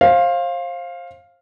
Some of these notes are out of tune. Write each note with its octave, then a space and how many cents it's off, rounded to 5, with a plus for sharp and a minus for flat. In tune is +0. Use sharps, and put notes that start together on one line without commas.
C5 +30 F5 +0